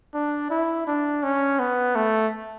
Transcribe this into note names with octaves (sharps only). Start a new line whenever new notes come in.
D4
E4
D4
C#4
B3
A3